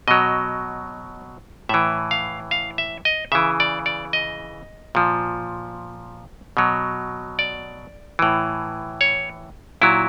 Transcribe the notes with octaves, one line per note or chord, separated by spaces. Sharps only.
B2 F#3 D#5
A2 E3 E5
F5
F5
E5
D#5
C#3 E3 E5
D5
D5
D#5
A#2 F3
B2 F#3
D5
A2 E3
C#5
A#2 F#3 E4